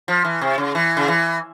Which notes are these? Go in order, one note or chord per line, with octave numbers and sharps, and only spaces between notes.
F3
E3
C3
C#3
E3
C#3
E3